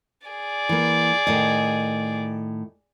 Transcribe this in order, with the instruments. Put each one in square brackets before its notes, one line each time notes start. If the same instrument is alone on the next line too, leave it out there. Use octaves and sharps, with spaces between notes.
[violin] G#4 D5
[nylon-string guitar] E3 A#3
A2 D#3 D#5